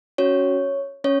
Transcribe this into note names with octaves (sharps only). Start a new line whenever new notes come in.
C#4 F#4 C#5
C#4 C#5